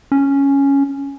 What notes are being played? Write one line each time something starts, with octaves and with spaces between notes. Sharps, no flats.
C#4